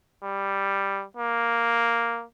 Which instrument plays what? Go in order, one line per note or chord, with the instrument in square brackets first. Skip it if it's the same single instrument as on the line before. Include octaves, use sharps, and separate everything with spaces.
[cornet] G3
A#3